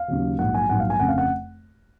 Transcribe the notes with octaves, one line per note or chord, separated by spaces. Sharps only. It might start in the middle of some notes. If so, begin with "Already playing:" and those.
Already playing: F5
D#2 C#3 F#3
A#1 G#2 F#3 F#5
G#5
A#1 G#2 F#3 F#5
F5
G#5
F1 F2 C#3 F#5
F5
F#5